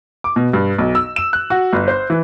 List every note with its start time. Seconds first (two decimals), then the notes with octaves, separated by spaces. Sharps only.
0.24 D6
0.36 B2
0.53 G2
0.78 B1
0.95 E6
1.16 E7
1.33 F#6
1.50 F#4
1.73 G1
1.88 C5
2.10 E3